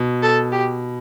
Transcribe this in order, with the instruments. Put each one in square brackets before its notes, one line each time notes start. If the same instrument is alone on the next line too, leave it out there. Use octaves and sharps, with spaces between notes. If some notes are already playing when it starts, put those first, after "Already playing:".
Already playing: [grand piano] B2
[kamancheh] A4
G4